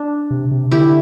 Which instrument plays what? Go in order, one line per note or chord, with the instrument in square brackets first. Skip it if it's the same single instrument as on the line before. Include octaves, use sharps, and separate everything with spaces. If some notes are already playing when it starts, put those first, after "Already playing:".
Already playing: [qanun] D4
[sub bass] C3
C3
[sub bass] D3 [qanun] E4 G4